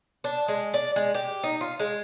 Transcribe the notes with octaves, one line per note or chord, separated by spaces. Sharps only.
D4
G#3
D5
G#3
G4
D#4
F4
G#3